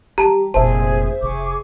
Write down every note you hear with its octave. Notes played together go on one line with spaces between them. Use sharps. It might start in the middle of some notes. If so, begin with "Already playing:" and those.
E3 G3 G4 A5 A#5
F1 A#2 G#4 C5 E5 A5
F1 C3 G#4 C#6 D6